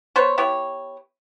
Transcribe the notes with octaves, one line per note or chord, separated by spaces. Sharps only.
B3 C5 C#5
B3 E4 G4 C#5